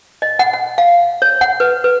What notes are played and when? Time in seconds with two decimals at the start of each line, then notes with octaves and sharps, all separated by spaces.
0.22 D#5
0.39 F#5
0.53 F#5
0.78 F5
1.22 C#5
1.41 F#5
1.60 B4
1.84 B4